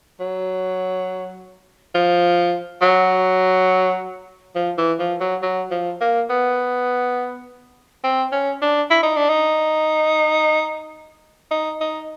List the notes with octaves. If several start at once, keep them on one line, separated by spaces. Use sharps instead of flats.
F#3
F3
F#3
F3
E3
F3
F#3
F#3
F3
A#3
B3
C4
C#4
D4
E4
D#4
D4
D#4
D#4
D#4